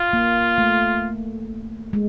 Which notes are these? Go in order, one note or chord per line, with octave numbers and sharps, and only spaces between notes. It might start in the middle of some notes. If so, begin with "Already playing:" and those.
Already playing: F4
A#3
A3
G#3